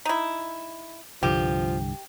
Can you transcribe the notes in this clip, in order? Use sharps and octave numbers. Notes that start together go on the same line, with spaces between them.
D#4 E4
C2 G2 D3 F3 G4